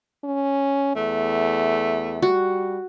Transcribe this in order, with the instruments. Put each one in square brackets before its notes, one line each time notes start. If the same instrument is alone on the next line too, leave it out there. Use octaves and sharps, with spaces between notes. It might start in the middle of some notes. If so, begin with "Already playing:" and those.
[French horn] C#4
[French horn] E2 [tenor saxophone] A3
[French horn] G3 [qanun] F#4